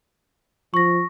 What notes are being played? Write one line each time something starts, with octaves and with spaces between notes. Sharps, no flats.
F3 C#6 A#6